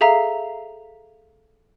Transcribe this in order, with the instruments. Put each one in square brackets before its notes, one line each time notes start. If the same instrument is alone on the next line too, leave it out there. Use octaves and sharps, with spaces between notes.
[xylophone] G#4 A4 E5 F5 A#5